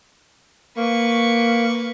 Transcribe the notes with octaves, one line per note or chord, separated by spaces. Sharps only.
A#3 B4 C#6